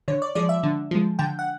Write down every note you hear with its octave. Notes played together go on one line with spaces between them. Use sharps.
D3 C#5
D5
F3 G#3 D5
E5
D3
F3 G#3
D3 G5
F#5